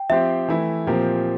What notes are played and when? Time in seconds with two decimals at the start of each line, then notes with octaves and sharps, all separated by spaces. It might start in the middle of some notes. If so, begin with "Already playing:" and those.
Already playing: G5
0.10 F3 C4 G4 C5 E5
0.48 E3 A3 E4
0.86 A#2 F3 C4 G4 A#4